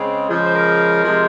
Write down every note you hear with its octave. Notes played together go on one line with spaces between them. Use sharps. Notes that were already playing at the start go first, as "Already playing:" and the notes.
Already playing: C#3 G#3 C4
C#3 F3 G#3
C5
A#4
C3 F3 G#3